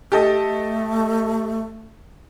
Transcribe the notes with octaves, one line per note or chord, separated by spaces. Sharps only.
A3 G4 A4 D#5